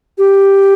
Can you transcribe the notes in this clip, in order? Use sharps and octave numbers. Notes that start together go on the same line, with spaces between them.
G4